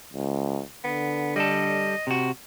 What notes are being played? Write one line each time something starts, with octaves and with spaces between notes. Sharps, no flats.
C#2
D3 B3
G3 A4 D#5
C3 F#4